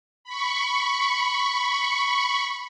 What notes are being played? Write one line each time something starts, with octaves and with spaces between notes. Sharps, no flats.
B5 C#6